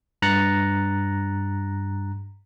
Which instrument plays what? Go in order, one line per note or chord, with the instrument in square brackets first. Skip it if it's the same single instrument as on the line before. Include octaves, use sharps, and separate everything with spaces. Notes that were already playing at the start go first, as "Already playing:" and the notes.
[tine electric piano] G2 A#5 F#6 A6 A#6 C#7